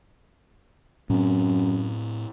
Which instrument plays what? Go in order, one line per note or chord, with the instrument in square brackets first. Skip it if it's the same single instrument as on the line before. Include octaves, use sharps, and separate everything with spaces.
[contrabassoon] F#2 [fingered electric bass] A2 C4